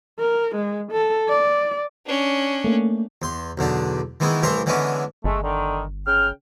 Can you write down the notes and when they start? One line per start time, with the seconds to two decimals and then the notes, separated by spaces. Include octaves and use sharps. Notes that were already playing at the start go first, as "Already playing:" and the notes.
0.19 A#4
0.55 G#3
0.92 A4
1.29 D5
2.06 C#4 D4
2.64 A3 A#3
3.22 E2 C6
3.58 B1 E2 D3 D4
4.20 D#3 E3 G#3 B3 E4
4.42 C2 A2 E3 E5 A#5 C6
4.66 D3 E3 G#3 B3 C#4 D4
5.24 G1 G#3 A3
5.42 D3 D#3
6.06 C#3 G5 F6